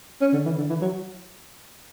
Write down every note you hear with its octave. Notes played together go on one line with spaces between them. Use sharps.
C#4
D3
E3
D3
E3
F#3